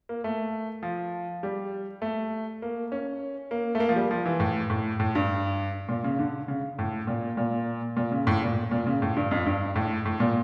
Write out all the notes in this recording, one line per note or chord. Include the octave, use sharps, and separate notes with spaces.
A#3
A3
F3
G3
A3
A#3
C#4
A#3
A3
A#3
F3
G3
F3
E3
A2
A2
A2
G2
A#2
C#3
D3
C#3
A2
A#2
A#2
A#2
C#3
A2
A#2
A#2
C#3
A2
G2
F2
G2
A2
A2
A#2